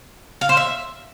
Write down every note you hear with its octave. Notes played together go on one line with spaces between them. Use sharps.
F5
C5
E5